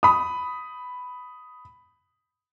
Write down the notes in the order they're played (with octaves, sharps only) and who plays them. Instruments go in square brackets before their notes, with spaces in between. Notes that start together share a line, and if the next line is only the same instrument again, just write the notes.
[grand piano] B5 D#6